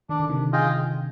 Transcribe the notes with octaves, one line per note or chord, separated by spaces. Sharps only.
D#3 D4
D3
C3 D#3
F4 G#4 D#5 G5